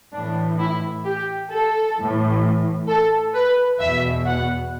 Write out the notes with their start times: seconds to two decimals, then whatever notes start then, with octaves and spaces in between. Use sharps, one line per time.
0.14 A2 E3 D4
0.59 E4
1.05 G4
1.50 A4
1.96 A2 E3
2.88 A4
3.34 B4
3.79 E2 B2 E5
4.26 F#5